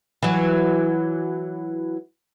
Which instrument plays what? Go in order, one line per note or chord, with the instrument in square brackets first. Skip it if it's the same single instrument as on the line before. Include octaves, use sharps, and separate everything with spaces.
[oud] E3 F#3